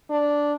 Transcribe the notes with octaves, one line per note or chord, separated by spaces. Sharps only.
D4